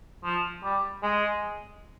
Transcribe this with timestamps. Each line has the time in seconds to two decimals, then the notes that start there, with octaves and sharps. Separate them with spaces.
0.24 F3
0.64 G3
1.02 G#3